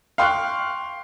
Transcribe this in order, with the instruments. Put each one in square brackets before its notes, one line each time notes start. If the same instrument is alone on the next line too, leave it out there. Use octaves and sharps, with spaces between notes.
[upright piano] F5 G5 C6 C#6 F6 F#6